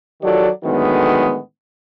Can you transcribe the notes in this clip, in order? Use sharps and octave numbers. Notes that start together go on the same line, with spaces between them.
D#3 F#3 F4 G4 A4 D5
A2 D3 D#3 F#3 G#3 B3